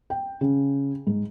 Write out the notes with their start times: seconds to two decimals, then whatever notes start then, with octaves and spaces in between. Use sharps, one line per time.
0.10 G5
0.41 C#3
1.07 G#2